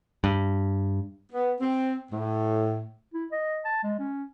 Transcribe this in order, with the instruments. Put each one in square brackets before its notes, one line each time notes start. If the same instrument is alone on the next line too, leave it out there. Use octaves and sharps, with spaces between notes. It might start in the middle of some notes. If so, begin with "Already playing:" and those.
[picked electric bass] G2
[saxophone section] B3
C4
A2
[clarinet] E4
D#5
A5
G#3
C#4